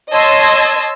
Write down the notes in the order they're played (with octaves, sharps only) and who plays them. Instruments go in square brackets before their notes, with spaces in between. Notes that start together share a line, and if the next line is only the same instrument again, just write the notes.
[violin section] C#5 D#5 A5 C6 E6 G#6